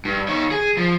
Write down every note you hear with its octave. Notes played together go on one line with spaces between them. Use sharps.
G2
D#3 C#5
G#4
F3